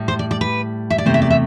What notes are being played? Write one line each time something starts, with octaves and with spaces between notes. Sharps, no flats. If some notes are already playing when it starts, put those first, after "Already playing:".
Already playing: A2 G3
C5
D5
D5
B4
E5
D5
E2 C3 E3 A3 C5
E5
D5
E5